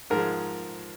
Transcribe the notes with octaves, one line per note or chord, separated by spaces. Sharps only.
G#2 F3 G#3 A#4